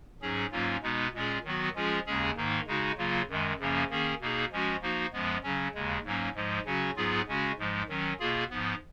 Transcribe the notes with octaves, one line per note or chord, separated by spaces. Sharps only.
G#2 F#3 C#4 G#4
G#2 F#3 A#3 C#4 F4
B2 G#3 B3 D#4
A#2 G#3 C#4 F4 G#4
D#3 F#3 B3 F#4
F3 G#3 C#4 F4 G#4
D#2 C#3 G#3 C#4 G#4
G#2 D#3 A#3 D#4
C#3 G#3 D#4 F#4
C#3 F#3 A#3 F4
F#2 D#3 G#3
F#2 C#3 F3 A#3 C#4
D#3 A#3 C#4 G#4
B2 A#3 D#4 G#4
F3 G#3 C#4 F#4
F3 A#3 D#4 F#4
F#2 F3 G#3 B3
C#3 F#3 C#4
D#2 C#3 G#3
G#2 F#3 A#3 C#4
G#2 F3 G#3
C#3 F#3 C#4 F#4
G#2 F#3 B3 F4 G#4
C#3 G#3 C#4 F#4
G#2 F3 G#3
D#3 F#3 C#4
B2 A#3 F4 G#4
G#2 F3 B3